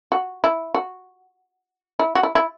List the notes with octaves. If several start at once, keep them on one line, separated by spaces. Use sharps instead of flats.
F#4
E4
F#4
E4
F#4
E4
E4